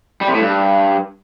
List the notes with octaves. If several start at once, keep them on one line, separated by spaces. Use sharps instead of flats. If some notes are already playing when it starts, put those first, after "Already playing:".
G3
C3
A2
G2